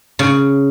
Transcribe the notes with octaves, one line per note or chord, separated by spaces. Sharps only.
C#3